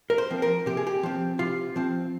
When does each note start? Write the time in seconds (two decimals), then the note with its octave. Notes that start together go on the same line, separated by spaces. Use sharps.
0.10 A#4
0.18 C5
0.30 F3 C4
0.42 A#4
0.66 C3 G4
0.77 G#4
0.87 G4
1.03 F3 C4
1.39 C3 F4
1.76 F3 C4